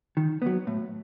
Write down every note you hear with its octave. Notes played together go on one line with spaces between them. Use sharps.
D#3
F#3 B3
A2